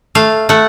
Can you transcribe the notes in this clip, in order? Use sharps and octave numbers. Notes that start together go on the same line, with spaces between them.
A3 F5
A3 F#5